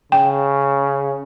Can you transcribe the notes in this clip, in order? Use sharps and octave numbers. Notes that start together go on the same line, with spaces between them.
C#3 G5